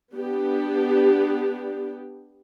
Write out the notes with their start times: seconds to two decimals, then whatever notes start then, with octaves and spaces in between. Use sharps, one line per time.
0.13 B3 D4 G4